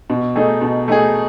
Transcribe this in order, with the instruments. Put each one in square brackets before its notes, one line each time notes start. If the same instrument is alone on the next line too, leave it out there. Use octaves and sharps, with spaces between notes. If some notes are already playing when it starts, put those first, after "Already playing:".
[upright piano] B2
A3 D#4 G#4
B2
A3 D#4 G#4